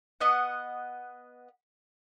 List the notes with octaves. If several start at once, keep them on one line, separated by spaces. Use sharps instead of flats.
B3 D#5 F#5